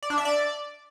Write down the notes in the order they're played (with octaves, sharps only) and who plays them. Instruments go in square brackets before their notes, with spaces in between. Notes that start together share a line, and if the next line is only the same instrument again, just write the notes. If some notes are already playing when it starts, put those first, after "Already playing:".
[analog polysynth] D5
D4
E5
D5